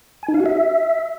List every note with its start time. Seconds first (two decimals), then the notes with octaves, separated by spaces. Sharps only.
0.23 G#5
0.28 D#4
0.34 F5
0.40 F#4
0.46 E5